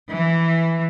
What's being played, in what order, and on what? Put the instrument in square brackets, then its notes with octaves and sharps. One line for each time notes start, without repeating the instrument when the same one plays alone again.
[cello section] E3